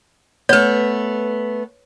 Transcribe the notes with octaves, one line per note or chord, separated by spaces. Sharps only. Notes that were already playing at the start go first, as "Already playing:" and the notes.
A3 B3 B4 C#5